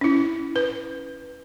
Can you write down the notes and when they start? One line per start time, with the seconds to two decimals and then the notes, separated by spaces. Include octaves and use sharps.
0.01 C#4 E4
0.56 B4